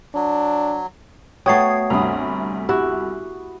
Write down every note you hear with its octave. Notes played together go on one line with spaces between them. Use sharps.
F#3 D4
A3 B3 F#4 C#5 G5 D#6 G#6 C7
D2 G2 C3 A#5 B5 D#6
E4 F#4 G4